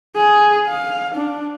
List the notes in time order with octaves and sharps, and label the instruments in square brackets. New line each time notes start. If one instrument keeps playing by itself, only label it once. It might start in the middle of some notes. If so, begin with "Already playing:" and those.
[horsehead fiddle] G#4
F5
D4